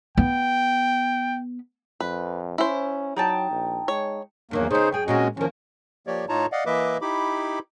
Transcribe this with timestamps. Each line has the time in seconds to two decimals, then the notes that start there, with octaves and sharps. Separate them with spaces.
0.17 B3 G5
2.00 F2 B4
2.58 C#4 E4 C5
3.17 F#3 D#4 G5 A5
3.51 A#1
3.88 G#3 C#5
4.51 E2 G2 D#3 F#3 A#3
4.71 C#3 B3 D#4 G#4 C5
4.92 F#2 G#4 G5
5.08 A#2 G#3 C4 C#4 F#4 D#5
5.37 E2 D#3 F3 A#3 C#4
6.07 F3 A#3 G4 C#5 D5
6.29 A2 D#4 F4 C#5 A5 A#5
6.52 D5 D#5 F5 F#5
6.66 E3 A#3 B4 D#5 E5 D6
7.01 D#4 E4 G4 B5 D6